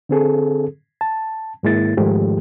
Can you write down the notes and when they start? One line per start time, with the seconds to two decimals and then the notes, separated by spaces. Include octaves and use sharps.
0.09 D3 C4 G#4 A4
1.01 A5
1.63 G#2 D#3 G#3 A#3 E4 A6
1.97 G#2 D#3 F3 G#3 A3 G4